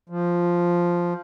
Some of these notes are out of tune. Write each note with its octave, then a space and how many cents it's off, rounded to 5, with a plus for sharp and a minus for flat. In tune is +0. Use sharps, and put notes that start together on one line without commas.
F3 +0